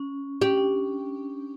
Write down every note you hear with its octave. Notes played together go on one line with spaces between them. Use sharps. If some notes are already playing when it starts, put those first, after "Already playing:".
Already playing: C#4
C#4 G4
D4
C#4